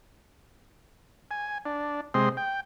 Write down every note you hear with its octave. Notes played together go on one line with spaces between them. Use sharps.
G#5
D4
C3 G#3 C4 D#5 C6
G5